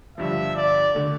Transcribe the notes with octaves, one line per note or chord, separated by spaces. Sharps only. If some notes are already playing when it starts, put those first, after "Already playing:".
G1 G2 F3 E5
D5
D3 A3